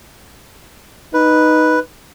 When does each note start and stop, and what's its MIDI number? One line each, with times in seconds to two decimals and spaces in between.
1.14 1.78 63
1.14 1.79 71